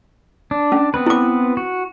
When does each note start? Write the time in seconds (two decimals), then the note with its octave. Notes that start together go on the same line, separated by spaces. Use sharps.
0.51 D4
0.72 C#4
0.94 B3 C4 B4
1.07 E4 D6
1.57 F#4